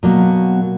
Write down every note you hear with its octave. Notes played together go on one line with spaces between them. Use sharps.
B2 F#3 A#3